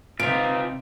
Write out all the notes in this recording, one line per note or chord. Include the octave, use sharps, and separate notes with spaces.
C3 C4 D#4 F4 B4 C5 D7